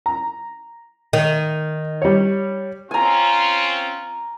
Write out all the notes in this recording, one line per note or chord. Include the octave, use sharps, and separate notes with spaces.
A#5
D#3
G3 C#5
C4 C#4 F4 G#5 A#5